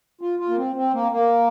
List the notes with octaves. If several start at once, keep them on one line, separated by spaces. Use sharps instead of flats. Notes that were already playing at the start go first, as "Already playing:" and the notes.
F4
F4
A#3
C4
C4
A#3
A#3